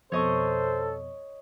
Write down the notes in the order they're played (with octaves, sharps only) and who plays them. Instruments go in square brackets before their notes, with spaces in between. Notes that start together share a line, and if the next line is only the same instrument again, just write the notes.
[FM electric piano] F2 B2 [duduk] A4 [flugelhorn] C5 [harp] C#5 D#5 C#6